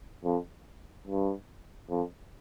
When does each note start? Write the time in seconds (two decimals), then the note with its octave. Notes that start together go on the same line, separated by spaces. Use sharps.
0.24 F2
1.07 G2
1.90 F2